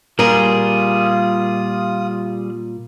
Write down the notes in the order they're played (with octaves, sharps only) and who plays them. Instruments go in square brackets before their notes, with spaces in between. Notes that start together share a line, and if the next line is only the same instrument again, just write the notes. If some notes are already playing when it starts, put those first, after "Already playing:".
[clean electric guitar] A#2 [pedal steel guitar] G3 G#4 [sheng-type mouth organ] F4 D#6 [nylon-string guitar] A#4